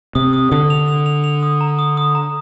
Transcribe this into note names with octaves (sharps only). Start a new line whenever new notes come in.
C3 D#6
D#6
D3 D#6
F7
F7
F7
F7
D#6
A#5
D#6
D#6
A#5